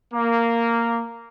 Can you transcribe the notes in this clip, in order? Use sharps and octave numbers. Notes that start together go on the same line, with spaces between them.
A#3